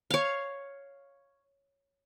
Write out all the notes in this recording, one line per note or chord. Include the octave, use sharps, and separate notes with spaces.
C#5 F5